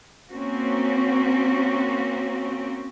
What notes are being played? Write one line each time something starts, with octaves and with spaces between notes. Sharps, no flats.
A#3 C4 C#4 F#4